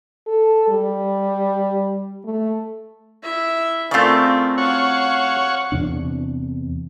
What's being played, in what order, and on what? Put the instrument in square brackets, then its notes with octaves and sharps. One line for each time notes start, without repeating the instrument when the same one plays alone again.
[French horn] A4
G3
A3
[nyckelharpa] E4 E5
[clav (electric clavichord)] C#3 A3 [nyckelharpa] C4 A#4 [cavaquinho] F4 D5
[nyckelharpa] F#4 F5 [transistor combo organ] C#5 F#5 C#6
[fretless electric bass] E2 C3 D4